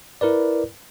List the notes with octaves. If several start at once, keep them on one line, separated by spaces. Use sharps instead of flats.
E4 A#4 B4 D5